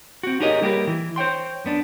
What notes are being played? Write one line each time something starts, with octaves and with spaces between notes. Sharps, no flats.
C4 F#4
D#4 G4 G#4 A#4 C#5 D#5
G3 A#3 G4 G#4 A#4 B4
E3
C5 C#5 G5 C6
F#2 B3 D4